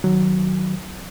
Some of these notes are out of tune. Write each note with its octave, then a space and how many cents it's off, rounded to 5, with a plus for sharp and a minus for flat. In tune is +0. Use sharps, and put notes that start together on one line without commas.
D#3 +0 F#3 +5